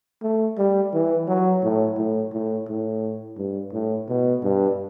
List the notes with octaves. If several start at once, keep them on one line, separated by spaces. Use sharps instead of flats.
A3
G3
E3
F#3
A2
A2
A2
A2
G2
A2
B2
G2